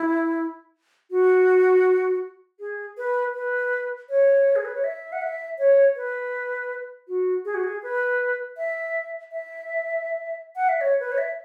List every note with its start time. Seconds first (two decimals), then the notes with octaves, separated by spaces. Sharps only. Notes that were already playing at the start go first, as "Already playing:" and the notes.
Already playing: E4
1.11 F#4
2.60 G#4
2.98 B4
3.35 B4
4.09 C#5
4.56 G#4
4.65 B4
4.74 C#5
4.84 E5
5.12 F#5
5.22 E5
5.59 C#5
5.96 B4
7.08 F#4
7.45 G#4
7.55 F#4
7.64 G#4
7.83 B4
8.57 E5
9.32 E5
10.56 F#5
10.69 E5
10.81 C#5
11.00 B4
11.12 C#5
11.18 E5